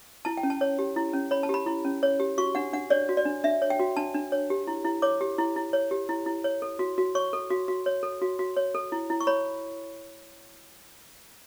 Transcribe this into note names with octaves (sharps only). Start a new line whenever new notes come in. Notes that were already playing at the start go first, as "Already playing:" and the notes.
E4 A5
G5
C#4
A5
C#5
G4
E4
C#4
C#5 B5
A5
G4 B5
E4
C#4
C#5
G4
F#4 C#6
D4 F#5
D4 F#5
C#5 D5
F#4
D5
D4
D4 E5
C#5
G5
F#4
D4 A5
D4
C#5
G4
E4
E4
C#5 D6
G4
E4
E4
C#5
G4
E4
E4
C#5
A4
F#4
F#4
C#5 C#6
A4
F#4
F#4
C#5
A4
F#4
F#4
C#5
A4
E4
E4
C#6
C#5 B5